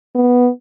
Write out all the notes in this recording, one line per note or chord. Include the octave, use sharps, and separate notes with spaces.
B3